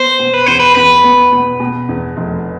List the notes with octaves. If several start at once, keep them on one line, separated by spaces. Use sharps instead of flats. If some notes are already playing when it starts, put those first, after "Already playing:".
Already playing: B3 C5
B2
B4
E2 C5
B4
E2 B4
B3
B2
B2
E2
F1